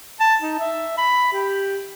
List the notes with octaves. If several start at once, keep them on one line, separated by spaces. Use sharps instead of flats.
A5
D#4
E5
B5
G4